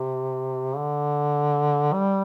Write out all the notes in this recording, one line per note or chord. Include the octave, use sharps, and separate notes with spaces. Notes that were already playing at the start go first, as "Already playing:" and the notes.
Already playing: C3
D3
G3